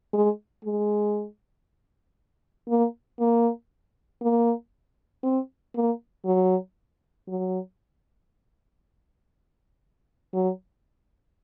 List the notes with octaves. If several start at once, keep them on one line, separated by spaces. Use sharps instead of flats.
G#3
G#3
A#3
A#3
A#3
C4
A#3
F#3
F#3
F#3